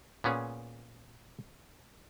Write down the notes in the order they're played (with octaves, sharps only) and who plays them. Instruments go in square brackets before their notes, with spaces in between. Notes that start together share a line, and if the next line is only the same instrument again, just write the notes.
[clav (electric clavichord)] A#2 B3 C#4 G#4